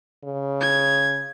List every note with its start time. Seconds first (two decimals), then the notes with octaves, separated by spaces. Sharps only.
0.24 C#3
0.61 G#6